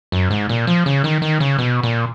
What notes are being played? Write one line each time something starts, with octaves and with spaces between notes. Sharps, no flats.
F#2
G#2
A#2
F3
C#3
D#3
D#3
C#3
B2
A#2